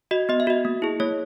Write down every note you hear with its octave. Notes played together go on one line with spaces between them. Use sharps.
F#4 D#5
B3 D#5
E5
F#4 D#5
A#3
E4 G#4
A#3 C#5